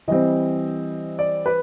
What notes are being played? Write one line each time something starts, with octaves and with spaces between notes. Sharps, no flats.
E3 G3 C4 D#5
D5
B4